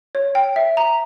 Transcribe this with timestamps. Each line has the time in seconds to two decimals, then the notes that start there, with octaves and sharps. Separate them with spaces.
0.15 C#5
0.35 G5
0.56 E5
0.77 A#5